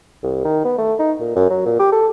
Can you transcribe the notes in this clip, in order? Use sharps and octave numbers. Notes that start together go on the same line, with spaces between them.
C2
D#3
B3
A3
D#4
A#2
F#2
F#3
A#2
G4
A4